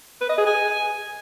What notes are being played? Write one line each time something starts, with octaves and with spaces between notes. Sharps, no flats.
B4
D#5
G#4
G#5